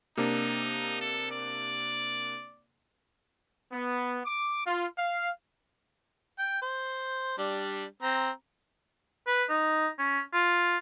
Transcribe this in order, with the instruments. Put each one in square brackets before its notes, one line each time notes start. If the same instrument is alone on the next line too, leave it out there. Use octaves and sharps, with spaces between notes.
[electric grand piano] C3 A#3 D4 [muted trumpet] D#4
[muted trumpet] A4
D5
[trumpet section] B3
D6
F4
F5
[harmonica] G5
C5
G3 D4
C4 A#5
[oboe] B4
D#4
C#4
F4